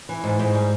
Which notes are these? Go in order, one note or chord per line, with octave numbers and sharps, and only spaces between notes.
E3
G#2
G#2
G3